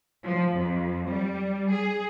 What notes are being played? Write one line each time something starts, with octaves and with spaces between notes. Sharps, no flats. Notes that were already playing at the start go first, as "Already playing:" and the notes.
F3
F2
G3
G#4